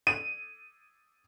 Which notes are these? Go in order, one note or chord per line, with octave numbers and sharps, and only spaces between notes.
D#7